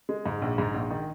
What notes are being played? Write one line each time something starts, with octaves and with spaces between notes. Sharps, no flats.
G#3
G#2
A#1
G#2
A#1
D#3